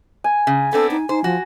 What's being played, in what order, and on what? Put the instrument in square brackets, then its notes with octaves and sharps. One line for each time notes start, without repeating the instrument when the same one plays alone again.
[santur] G#5
[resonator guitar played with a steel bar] C#3
[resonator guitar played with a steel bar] B3 C4 D4 [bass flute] A4
[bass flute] D#4
[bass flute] D#4 [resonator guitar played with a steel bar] C5
[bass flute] F3 [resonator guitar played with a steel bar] F#4